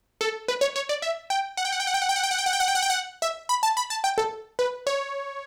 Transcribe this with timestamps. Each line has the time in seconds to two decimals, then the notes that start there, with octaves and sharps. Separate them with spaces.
0.21 A4
0.48 B4
0.61 C#5
0.76 C#5
0.89 D5
1.02 E5
1.30 G5
1.57 F#5
1.65 G5
1.72 F#5
1.80 G5
1.87 F#5
1.94 G5
2.02 F#5
2.09 G5
2.16 F#5
2.23 G5
2.31 F#5
2.38 G5
2.46 F#5
2.53 G5
2.60 F#5
2.68 G5
2.75 F#5
2.82 G5
2.90 F#5
3.22 E5
3.49 B5
3.63 A5
3.77 B5
3.90 A5
4.04 G5
4.18 A4
4.59 B4
4.87 C#5